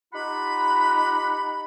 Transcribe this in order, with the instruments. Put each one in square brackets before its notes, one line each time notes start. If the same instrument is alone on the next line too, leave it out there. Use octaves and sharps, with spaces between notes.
[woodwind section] D#4 F4 G4 F#5 B5